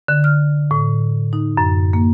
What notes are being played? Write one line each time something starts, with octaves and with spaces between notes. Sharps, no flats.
D3
F6
A2
D#4
F#2
A#3